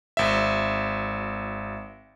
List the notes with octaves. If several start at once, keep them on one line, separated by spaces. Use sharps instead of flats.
G#1 E5